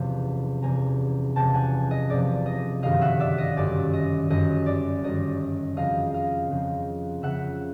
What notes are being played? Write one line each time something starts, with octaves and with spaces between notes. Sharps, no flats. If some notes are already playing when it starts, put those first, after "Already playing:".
Already playing: F#1 E2 C3 F3
F#1 E2 C3 F3 G#5 A#5
F#1 E2 C3 F3 G5 A5
F#5 G#5
D#5
F#1 E2 C3 F3 D5
D#5
G1 F#2 D#3 G3 D#5 F5
E5 F#5
D5 E5
D#5
G1 F#2 D#3 G3 D5
D#5
G1 F#2 D#3 G3 D#5
D5
G1 F#2 D#3 G3 D#5
F2 C#3 F3 D#5 F5
D#5 F5
F2 C#3 F3
F2 C#3 F3 E5 F#5